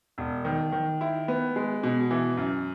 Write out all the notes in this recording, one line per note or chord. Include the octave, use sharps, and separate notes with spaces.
E1
D#3
D#3
E4
B3
G#3
B2
E3
F#2